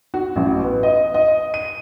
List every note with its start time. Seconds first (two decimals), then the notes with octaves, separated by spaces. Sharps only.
0.14 F#4
0.36 A1
0.64 B3
0.83 D#5
1.14 D#5
1.54 D#7